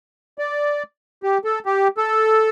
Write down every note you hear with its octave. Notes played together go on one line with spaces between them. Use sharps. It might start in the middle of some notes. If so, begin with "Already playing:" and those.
D5
G4
A4
G4
A4